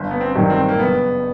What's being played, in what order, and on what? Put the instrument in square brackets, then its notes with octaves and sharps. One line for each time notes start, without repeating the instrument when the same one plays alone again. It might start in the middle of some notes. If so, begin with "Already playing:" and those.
Already playing: [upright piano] G1
[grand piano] B3
C4
[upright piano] G2 D#3 F#3
[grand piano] C4
A#3
[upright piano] F#1 [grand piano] B3